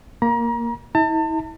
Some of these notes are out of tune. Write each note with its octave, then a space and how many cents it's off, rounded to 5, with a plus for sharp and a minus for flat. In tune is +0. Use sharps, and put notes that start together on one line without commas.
A#3 +0 A#5 +35
E4 -40 A5 +40